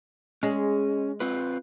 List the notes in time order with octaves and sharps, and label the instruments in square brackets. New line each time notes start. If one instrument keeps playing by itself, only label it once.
[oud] G#3 [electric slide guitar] C#4
[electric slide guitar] C4 F4 B4